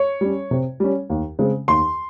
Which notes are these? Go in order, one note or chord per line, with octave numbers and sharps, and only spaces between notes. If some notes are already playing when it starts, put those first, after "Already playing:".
Already playing: C#5
G3 C#4
C3
G3 C#4
D#2
C#3 G#3 C4
D#2 C6